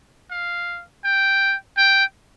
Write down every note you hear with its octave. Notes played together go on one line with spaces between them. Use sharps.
F5
G5
G5